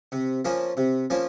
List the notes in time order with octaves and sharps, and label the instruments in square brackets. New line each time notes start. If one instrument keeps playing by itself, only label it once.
[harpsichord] C3
F3 A#3 C#4 F4
C3
F3 A#3 C#4 F4